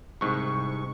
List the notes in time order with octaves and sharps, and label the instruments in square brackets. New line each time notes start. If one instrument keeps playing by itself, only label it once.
[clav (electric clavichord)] C2 G#2 [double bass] C3 [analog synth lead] C#6